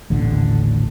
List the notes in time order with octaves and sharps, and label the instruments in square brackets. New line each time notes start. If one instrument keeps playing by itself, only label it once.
[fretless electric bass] D#1 A1 D3